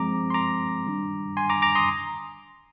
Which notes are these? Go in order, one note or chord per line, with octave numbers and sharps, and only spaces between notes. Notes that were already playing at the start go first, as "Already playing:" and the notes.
Already playing: F3 G#3 C4 A#5 D6
C6
A#5 D6
D#3 G3 D4
G#5 C6
A#5 D6
A#5 D6
C6 D#6